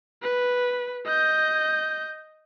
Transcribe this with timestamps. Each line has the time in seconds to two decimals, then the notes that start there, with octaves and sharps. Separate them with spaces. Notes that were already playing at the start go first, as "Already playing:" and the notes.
0.22 B4
1.06 D#5 G6